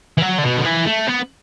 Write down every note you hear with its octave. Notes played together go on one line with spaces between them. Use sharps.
E3
F#3
D3
B2
D3
E3
A3
B3